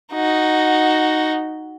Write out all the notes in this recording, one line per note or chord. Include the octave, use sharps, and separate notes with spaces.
D#4 F#4